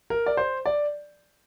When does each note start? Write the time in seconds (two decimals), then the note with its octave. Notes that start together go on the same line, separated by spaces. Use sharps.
0.10 A#4
0.26 D5
0.37 C5
0.66 D5